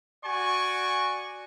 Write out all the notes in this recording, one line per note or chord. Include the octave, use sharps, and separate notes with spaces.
F#4 D5 G#5 C#6